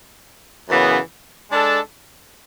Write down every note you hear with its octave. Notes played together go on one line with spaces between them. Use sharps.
F#2 C#3 E3 B3
G#3 D4 A4